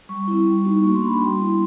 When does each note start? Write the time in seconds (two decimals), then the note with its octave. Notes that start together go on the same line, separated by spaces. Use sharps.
0.09 G3 C#6
0.28 C4 E4
0.46 G3
0.64 B3 D#4 F#4
0.83 A#3 C#6
0.95 C6
1.02 D4 F#4 B5
1.17 G3 C6
1.40 B3 E4